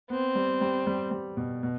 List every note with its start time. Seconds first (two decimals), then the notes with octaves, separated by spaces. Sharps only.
0.10 B3 C4
0.35 G3
0.61 G3
0.87 G3
1.11 G3
1.37 B2
1.63 B2